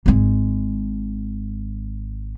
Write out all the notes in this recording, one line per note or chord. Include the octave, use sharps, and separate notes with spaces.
G#1 G#3